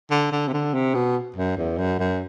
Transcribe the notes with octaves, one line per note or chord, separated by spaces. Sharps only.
D3
D3
C3
D3
C3
B2
F#2
E2
F#2
F#2